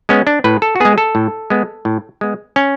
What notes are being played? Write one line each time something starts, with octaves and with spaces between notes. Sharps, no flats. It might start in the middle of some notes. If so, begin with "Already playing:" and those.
G#3 B3 C#4
D4
A2 B4
A4
F#4
G#3 B3 G#4
A4
A2
G#3 B3
A2
G#3 B3
C#4